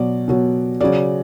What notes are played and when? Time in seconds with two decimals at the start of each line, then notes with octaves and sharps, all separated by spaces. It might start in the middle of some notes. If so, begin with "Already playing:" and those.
Already playing: B2 F#3 D5
0.28 B2 F#3
0.81 C#3 F#3 D5